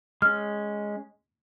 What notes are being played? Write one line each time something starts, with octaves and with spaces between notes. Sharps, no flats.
G#3 C#4 F6